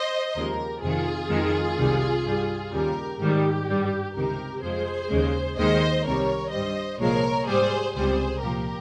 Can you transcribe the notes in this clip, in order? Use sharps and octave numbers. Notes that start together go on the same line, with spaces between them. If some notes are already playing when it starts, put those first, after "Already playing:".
Already playing: C5 D#5
D#2 C#3 F3 G#3 G4 A#4
F2 C3 D#3 F4 G#4
F2 D#3 G#3
C2 C3 D#3 G3
G2 G3
D#2 C#3 G3 G4 A#4
G#2 D#3 G3 G4
G2 G3
C#2 C3 D#3 G4 A#4
F2 C3 F3 G#3 G#4 C5
D#2 C#3 G#3
D#2 D#3 G#3 C5 D#5
C2 C3 D#3 G3 A#4 C#5
G2 G3 C5 D#5
C2 A#2 F3 G#3 A#4 C#5
G#2 G3 G#4 C5
C#2 C3 G3 G#4 C5
C2 A#2 F3 G4 A#4